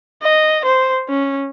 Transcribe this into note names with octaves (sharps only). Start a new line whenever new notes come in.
D#5
C5
C#4